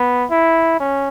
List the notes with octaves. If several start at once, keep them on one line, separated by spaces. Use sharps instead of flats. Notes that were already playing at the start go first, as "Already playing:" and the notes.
Already playing: B3
E4
C#4